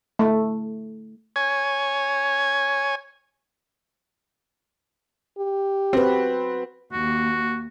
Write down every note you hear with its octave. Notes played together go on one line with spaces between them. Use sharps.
A3
C#5 G#5
G4
C4 F#4 B4
D#2 A#3 F#4